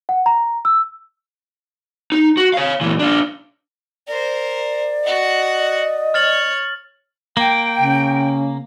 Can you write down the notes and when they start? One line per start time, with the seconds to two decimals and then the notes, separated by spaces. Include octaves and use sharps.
0.09 F#5
0.26 A#5
0.65 E6
2.12 D#4
2.37 F#4
2.54 C#5 F5
2.81 A#2 E3
2.99 D4 F4
4.08 A#4 C5 D5
5.04 F#4 D#5 F#5
6.14 C#5 F6 A6 F#7
7.37 A#3 G5
7.78 C#3